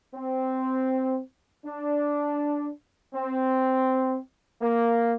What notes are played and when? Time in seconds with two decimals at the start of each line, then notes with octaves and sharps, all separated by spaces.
0.15 C4
1.65 D4
3.14 C4
4.62 A#3